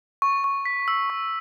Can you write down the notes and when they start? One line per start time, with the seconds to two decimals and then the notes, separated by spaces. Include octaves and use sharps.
0.22 C#6
0.44 C#6
0.65 B6
0.88 E6
1.10 C#6